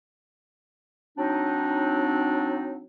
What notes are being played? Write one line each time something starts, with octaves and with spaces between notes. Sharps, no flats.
F#3 C4 D4 D#4